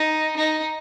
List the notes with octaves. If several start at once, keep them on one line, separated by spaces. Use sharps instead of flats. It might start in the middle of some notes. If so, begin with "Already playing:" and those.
Already playing: D#4
D#4